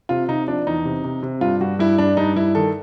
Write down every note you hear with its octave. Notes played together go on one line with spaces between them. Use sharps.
C3 F4
C3 D#4
F3 D4
E2 D#4
C3
C3
C3
G2 F4
G2 F#4
G2 E4
G2 D4
G2 D#4
G2 E4
D#3 A4